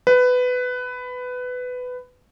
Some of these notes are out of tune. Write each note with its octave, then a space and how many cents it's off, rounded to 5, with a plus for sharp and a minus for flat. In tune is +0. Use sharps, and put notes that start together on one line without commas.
B4 +15